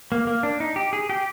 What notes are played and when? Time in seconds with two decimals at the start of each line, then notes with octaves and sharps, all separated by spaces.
0.12 A#3
0.27 A#3
0.43 D4
0.60 D#4
0.76 G4
0.93 G#4
1.09 G4